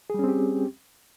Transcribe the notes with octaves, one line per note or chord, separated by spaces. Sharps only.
G3 C4 C#4 G4 G#4